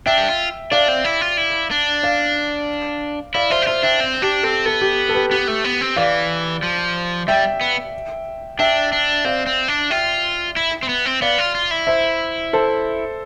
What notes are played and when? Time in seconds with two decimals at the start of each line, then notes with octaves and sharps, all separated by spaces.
0.06 D4 E5 G5
0.18 G4
0.28 F4
0.71 D4 D5 F5
0.88 C4
1.05 E4
1.21 F4
1.37 E4
1.71 D4
2.03 D5 F5
3.34 E4 D5 F5
3.50 F4 C5 E5
3.62 G4
3.67 F4 C5 E5
3.83 D4 E5 G5
4.00 C4
4.22 D4 G4
4.43 C4 A4
4.66 B3 A4
4.81 G4
5.09 A4
5.14 G4 B4
5.31 B3 G4
5.48 A3
5.64 B3
5.81 C4
5.97 E3 D5 F5
6.63 F3
7.28 G3 E5 G5
7.61 B3
8.59 D4 E5 G5
8.93 D4
9.25 C4 D5 F5
9.46 C4
9.68 D4
9.90 F4 E5 G5
10.56 E4
10.83 C4
10.89 B3
11.05 C4
11.22 B3 D5 F5
11.38 F4
11.55 F4
11.71 E4
11.87 C5 E5
12.53 A4 C5